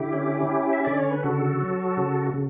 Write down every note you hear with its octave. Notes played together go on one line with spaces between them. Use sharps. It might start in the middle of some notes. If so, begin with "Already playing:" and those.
Already playing: D3 E4 G4
C#4
C#4
E5
D3 D5
C#5
B4
C#3 F#4 A4
F#3
C#3
C#3